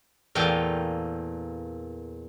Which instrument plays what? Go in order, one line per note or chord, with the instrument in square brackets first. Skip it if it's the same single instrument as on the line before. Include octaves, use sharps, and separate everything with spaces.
[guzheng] E2 A#2 A3 F5 G5